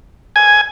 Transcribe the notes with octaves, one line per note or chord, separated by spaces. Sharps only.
G#5